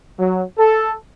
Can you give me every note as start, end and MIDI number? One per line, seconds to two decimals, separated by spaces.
0.19 0.43 54
0.58 0.94 69